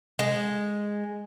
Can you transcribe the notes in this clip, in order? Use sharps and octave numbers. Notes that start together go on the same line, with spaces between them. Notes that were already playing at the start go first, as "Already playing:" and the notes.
G#3